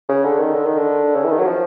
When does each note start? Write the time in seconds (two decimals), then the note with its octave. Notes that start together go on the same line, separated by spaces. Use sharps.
0.09 C#3
0.24 D3
0.39 D#3
0.55 D3
0.66 D#3
0.78 D3
1.15 C#3
1.24 E3
1.31 D#3
1.38 F#3
1.46 F3